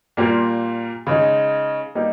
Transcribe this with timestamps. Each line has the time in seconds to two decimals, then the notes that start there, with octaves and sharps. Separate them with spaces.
0.17 A#2 G3 A#3 F4
1.07 C#3 G#3 D#4
1.95 G3 A#3 D#4